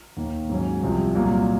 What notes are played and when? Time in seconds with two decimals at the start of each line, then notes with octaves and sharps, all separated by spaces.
0.17 D#2 D#3 A#3
0.49 G#2 F#3 C#4
0.82 C2 C3 F3
1.15 C2 A#2 F#3 A#3